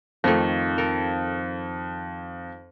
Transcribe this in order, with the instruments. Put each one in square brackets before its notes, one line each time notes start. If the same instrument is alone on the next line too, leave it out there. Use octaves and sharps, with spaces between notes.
[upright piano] F2 [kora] D#3 F3 A3
[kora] A4 A#4